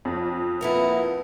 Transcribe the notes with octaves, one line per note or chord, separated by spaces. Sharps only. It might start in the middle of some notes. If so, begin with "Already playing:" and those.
F2
A#3 B3 E4